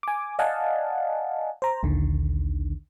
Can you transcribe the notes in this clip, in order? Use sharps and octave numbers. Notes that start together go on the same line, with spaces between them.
G#5 D6
D5 D#5 F5 F#5 G#5 A5
C5 A#5
A#1 D#2 D3 D#3